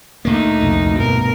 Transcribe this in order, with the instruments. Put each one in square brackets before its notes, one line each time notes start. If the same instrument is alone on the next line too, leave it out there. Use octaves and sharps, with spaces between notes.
[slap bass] D2 A#2 A#3 [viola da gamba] A3 D#4
[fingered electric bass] C2 F2 C3
[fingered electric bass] G2 B2 [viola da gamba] A#4